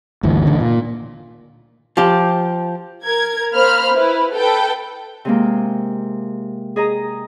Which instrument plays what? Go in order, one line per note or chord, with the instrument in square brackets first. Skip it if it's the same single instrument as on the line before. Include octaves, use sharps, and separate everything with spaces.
[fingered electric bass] G1 D2 E3
A1 D3 D#3
A#2
[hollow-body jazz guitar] F3 G4
[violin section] A#4 G#6
A#3 C5 B5 F6
E4 B4
A4 B4 G5
[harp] C3 G#3 A#3
G#4 D#5 A#5